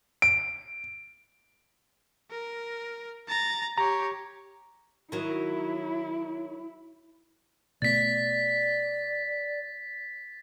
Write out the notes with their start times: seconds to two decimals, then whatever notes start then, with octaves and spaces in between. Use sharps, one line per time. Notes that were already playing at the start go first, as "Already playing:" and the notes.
0.22 D7
2.31 A#4
3.28 A#5 A6
3.78 G4 C#5 A#5
5.12 D#3 F#3 E4
7.82 B2 A3 B3 D5 A6 B6